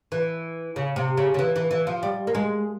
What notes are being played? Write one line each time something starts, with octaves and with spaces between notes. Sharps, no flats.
E3
C#3
C3
C#3
C#3
E3
E3
E3
F3
G3
A#3
G#3